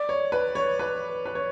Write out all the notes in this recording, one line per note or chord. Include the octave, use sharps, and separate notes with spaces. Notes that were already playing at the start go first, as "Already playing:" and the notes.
Already playing: D5
C#5
B4
C#5
B4
B4
C#5